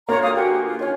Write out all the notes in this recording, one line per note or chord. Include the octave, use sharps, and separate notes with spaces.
D3 A#3 F4 C#5 A#5 C6
F#4 G4 F5 D#6
F#4 G4 B4 G#5 C6
G4
F4
D#3 C#4 F4 C#5